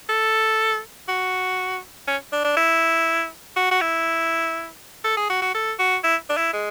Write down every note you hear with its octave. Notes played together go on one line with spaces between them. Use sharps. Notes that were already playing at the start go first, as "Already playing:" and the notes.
A4
F#4
C#4
D4
D4
E4
F#4
F#4
E4
A4
G#4
F#4
F#4
A4
F#4
E4
D4
E4
G#3